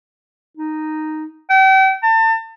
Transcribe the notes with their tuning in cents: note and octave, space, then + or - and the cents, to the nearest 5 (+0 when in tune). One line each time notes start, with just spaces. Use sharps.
D#4 -5
G5 -40
A5 +35